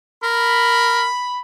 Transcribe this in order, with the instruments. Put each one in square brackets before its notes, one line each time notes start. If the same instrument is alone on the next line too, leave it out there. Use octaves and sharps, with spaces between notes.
[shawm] A#4 [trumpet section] B5